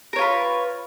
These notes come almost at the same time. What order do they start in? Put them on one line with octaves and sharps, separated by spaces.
A#4 C#5 F4 B4